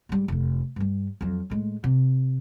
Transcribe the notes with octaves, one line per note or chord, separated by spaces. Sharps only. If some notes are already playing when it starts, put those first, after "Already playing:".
G#2 G3
F1 E2
G2 G3
F2 F#3
A2 G#3
C3